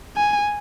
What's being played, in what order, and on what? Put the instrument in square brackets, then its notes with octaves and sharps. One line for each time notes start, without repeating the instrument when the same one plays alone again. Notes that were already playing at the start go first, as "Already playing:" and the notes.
[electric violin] G#5